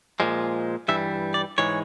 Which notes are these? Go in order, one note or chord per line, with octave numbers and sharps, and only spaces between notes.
A#2 F3 G#3
G2 E3 G3 E5
D5
G#2 E3 G#3 C#5